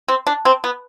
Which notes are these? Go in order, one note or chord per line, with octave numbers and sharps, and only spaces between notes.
C4
D4
C4
B3